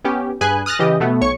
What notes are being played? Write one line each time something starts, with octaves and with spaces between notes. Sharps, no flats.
B3 C#4 G4
G2 G#4 B4 G#5 F#6
D#6 F6 F#6 A6 A#6
C#3 E3 G4 D#5
B2 A3 B3
B1 C#5 C#6 C#7